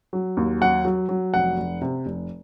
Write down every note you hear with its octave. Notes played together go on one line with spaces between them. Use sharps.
F#3
D#2
F#3 F#5
F#3
F#3
F1 F#5
F1
C3
F1